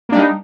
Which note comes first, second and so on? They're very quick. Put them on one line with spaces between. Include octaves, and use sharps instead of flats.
A#3 D4 G3 D#4